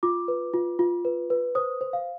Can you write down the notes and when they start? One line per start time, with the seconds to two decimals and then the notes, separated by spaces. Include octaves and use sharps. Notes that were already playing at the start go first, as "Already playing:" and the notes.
0.03 F4 D6
0.28 B4
0.54 F4
0.79 F4
1.05 B4
1.30 B4
1.55 C5 D#6
1.81 C5
1.93 F5